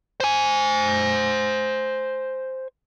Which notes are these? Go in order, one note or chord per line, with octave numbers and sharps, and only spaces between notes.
C5 G#5